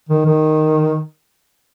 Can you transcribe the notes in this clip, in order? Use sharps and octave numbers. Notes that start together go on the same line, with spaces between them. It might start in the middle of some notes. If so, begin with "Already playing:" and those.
D#3
D#3